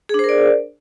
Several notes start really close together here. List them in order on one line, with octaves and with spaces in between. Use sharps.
G#4 D4 C5 A#4 D5